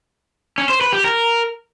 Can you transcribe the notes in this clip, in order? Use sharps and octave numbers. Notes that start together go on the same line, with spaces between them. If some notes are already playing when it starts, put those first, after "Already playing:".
C#4
C5
B4
G4
A#4